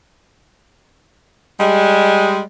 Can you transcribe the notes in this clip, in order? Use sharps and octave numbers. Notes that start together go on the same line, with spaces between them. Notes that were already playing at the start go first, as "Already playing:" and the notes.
G3 G#3